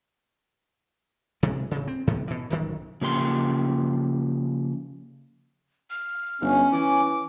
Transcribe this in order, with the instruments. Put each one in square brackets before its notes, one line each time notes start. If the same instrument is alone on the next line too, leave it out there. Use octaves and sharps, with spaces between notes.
[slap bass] F1 C3 E3 G#3
D1 C#3
C4
G#2 C3 D#3 B3
B2 E3
D1 B1 F#2 D#3
[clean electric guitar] C#3 F3 A#3 G4 G5 C6
[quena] F6
[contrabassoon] G1 [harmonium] C#4
[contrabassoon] E3 [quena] D6